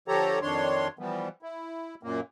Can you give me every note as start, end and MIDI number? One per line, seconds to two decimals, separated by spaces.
0.08 0.39 50
0.08 0.39 53
0.08 0.39 67
0.08 0.39 69
0.08 0.39 73
0.08 0.39 82
0.42 0.88 41
0.42 0.88 51
0.42 0.88 62
0.42 0.88 73
0.42 0.88 84
0.99 1.29 52
0.99 1.29 53
0.99 1.29 55
0.99 1.29 59
1.42 1.95 64
2.03 2.20 42
2.03 2.20 46
2.03 2.20 58